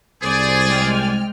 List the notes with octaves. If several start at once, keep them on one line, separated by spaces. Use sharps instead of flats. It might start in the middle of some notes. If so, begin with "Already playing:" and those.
C2 G#4 C5 D5 G#5
G#3 G5 F6